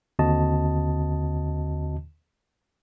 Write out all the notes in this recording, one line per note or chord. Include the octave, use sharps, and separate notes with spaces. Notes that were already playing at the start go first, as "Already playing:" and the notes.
D#2 D3 C4 F#4 D#5 A5